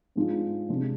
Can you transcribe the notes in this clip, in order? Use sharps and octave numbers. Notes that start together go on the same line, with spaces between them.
G#2 G#3 D4 F4
C3 G#3 D4